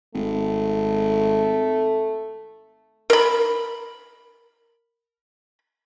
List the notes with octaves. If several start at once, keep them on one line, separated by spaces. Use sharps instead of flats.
G#1 A3
A#4 B5